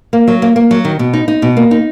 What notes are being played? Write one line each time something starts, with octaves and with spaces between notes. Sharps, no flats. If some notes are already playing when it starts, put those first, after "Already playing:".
A#3
F#3
A#3
A#3
F#3
D#3
B2
D#4
D#4
B2
A#3
D#4